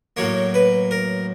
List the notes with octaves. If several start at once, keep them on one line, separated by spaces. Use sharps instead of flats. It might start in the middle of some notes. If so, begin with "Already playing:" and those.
A2 F#3 A#3 C#5
B4
A#4